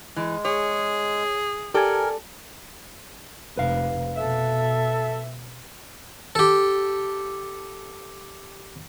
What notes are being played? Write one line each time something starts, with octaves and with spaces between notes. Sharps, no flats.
E3 G#3
G#4 C#5
G4 A4 A#4 D5 G#5
F1 B4 F5
B2 A4 E5
G4 A4